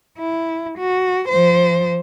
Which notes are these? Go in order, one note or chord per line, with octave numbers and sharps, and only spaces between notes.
E4
F#4
F3 C5